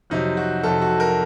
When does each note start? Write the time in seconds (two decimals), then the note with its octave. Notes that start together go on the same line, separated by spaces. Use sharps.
0.10 F2 C3 F#3 D#4
0.37 F#4
0.63 F2 C3 F#3 A4
0.82 F#4
1.00 A#4